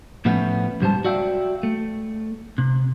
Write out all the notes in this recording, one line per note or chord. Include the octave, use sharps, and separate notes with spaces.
A2 F3 A3 B3 C#4
C#2 G#2 G3 C5 A5
F#4 D5 E5 F5 G5
A3
C3